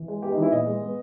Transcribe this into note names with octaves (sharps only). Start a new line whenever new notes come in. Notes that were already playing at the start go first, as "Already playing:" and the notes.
Already playing: E3
G#3
B3 G4
D#4
E3 E4
A#2 D#5
G#3
B3